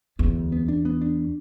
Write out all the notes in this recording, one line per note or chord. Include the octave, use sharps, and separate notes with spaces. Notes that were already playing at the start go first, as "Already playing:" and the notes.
E2 B3
D2
B3
D4
B3
D4